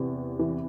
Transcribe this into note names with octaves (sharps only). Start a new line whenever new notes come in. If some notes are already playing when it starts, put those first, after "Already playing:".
Already playing: E2 C3
E3